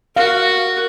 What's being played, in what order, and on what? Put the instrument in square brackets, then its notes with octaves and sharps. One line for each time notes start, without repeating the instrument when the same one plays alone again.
[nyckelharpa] F#4 [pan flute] A#4 [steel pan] F5